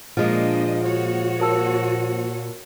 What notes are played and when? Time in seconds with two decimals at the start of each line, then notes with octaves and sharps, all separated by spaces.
0.17 A#2 F3 G#3 A#3 D4 D#5
0.80 F#4 C#5
1.40 A#4 A5 E6